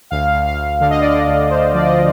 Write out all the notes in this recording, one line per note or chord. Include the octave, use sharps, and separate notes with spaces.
D2 F5
D2
F5
D2
D3 F5
D#5
D3 D5
D#5
D2
D2 C5
F3 D5
D#5